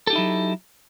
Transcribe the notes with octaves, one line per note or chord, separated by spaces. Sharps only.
F#3 D#4 E4 G4 A4